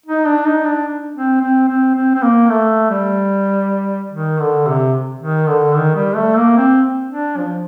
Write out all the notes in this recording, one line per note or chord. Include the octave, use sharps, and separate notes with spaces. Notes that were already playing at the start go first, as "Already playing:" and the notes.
D#4
D4
D#4
D4
C4
C4
C4
C4
C4
A#3
A3
G3
D#3
D3
C3
D#3
D3
D#3
G3
A3
A#3
C4
D4
F3